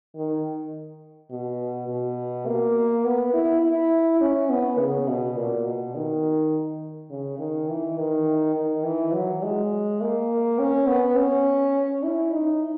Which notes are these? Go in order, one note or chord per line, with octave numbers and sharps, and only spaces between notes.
D#3
B2
B2
A#3
B3
E4
E4
C#4
B3
C#3
B2
A#2
B2
D#3
C#3
D#3
E3
D#3
D#3
E3
F#3
G#3
A#3
C#4
B3
C#4
E4
D#4